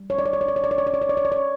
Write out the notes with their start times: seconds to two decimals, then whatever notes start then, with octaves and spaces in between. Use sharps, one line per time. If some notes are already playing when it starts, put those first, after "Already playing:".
Already playing: G3
0.10 C#5
0.18 D5
0.26 C#5
0.33 D5
0.41 C#5
0.48 D5
0.56 C#5
0.64 D5
0.71 C#5
0.78 D5
0.87 C#5
0.94 D5
1.02 C#5
1.09 D5
1.17 C#5
1.25 D5
1.32 C#5